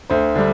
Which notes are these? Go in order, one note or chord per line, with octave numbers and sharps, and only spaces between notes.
D2 C5
D3 G3